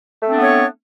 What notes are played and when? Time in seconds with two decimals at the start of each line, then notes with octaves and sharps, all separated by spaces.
0.22 A3
0.27 C4
0.31 D4
0.36 B3
0.41 C#5